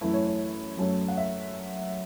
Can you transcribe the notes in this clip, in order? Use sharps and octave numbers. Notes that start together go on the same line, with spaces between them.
F#2 E3 A3 E4 B4
C#5
C#5
F#2 F#3 A3 C#4
F#5
E5